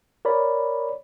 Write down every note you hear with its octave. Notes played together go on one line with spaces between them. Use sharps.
A#4 C#5 D5 B5